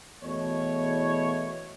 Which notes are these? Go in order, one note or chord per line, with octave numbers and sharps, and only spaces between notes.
E2 B2 A3 C#5